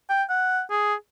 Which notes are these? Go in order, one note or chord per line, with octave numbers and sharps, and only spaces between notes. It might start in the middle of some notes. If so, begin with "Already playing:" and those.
G5
F#5
G#4